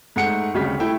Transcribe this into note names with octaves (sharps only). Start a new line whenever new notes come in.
G#2 A3 F#5 C#7
G#1 D2 C#3 G3 B6
A3 E4 G5